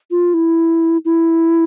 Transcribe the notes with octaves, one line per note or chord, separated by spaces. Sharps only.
F4
E4
E4